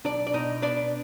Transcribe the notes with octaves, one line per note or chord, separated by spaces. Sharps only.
B1 D4 D5
D5
B2 D#4 D#5
B3 D4 D5